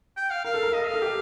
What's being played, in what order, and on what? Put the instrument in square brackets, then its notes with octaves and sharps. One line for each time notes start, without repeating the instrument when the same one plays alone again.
[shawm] G5
F5
[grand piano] A#4 [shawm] F5
[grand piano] A4
A#4
[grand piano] A4 [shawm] D#5
[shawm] F5
[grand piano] A4
G4